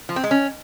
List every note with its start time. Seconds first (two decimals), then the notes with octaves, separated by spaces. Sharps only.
0.09 F3
0.16 C4
0.24 G#3
0.31 C#4